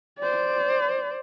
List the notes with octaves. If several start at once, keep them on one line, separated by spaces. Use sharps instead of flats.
C5 D5